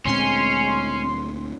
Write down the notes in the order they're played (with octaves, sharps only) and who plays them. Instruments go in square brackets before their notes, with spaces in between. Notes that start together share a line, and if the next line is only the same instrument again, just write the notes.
[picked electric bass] D2 A#2 C4 [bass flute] G#3 [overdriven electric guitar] C#4 [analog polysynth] C6